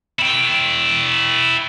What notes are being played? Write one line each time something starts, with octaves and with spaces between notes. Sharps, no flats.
E4 G5